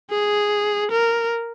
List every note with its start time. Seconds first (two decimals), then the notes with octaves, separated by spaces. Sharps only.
0.11 G#4
0.91 A#4